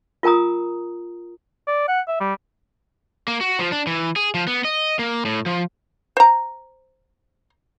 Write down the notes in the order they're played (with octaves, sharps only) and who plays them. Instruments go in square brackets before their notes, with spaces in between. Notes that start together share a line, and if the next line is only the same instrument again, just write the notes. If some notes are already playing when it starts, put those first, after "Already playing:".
[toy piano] F4 A#4 G#5 A#5 D#6
[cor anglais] D5
F#5
E5
G3
[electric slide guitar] A#3
F#4
F3
D4
E3
G#4
F3
B3
D#5
A#3
A2
F3
[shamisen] C5 A#5